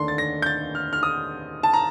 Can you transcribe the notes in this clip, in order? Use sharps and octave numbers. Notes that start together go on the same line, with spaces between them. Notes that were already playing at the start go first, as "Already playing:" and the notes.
Already playing: D#2 D3 A3 D4 C6
A6
A#6
G6
A6
F6
F6
D#6
A5
A#5